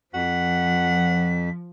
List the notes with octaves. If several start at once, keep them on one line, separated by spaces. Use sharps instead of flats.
F2 F3 F#5 B6